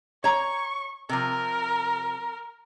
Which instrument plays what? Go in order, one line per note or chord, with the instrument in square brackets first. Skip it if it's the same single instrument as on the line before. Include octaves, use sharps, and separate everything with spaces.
[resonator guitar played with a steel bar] C#5 A#5 [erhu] C#6
[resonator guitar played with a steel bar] C3 F3 [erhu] A#4